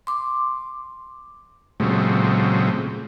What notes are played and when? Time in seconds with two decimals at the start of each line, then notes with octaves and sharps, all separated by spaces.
0.07 C6 D6
1.80 A#2 C#3 F#3 G#3 A3 C4